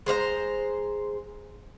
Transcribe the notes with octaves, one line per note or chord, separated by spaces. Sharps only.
G#3 C5 D5 A#5